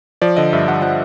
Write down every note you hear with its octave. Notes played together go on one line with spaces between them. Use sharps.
F3 D5
D3 D#5
G2 E5
G2 F#5
F3 F#5